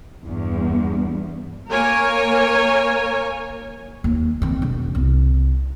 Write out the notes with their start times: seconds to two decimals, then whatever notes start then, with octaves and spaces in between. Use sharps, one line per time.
0.23 E2 G2
1.69 A#3 A#4 C#5 G#5
4.04 D#2
4.42 D#3 C4
4.62 E1
4.95 C2